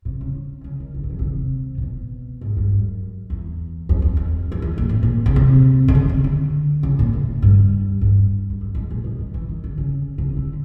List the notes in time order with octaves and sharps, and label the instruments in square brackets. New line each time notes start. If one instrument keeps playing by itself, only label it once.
[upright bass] C3
C#3
C#3
D#3
E3
D3
D#3
C#3
C3
C3
B2
G#2
G2
F#2
E2
F2
E2
F2
E2
F2
A#2
A2
A#2
C#3
C3
D3
C#3
C#3
D3
C#3
A#2
A2
G2
G2
F#2
F2
G#2
A#2
B2
D#3
E3
D#3
D3
C#3
C3
C#3
D3